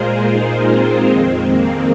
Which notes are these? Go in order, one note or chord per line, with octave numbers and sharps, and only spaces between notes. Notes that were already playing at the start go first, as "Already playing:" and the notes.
Already playing: A#2 G#3 F4 G#4 A#4 C5
D#4 G#4
C4 F4
F2 D#3 G#3 C4
A#3